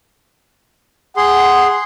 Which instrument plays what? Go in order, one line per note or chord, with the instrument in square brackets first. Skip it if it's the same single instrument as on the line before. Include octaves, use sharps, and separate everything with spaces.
[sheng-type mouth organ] G#4 C6 [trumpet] F#5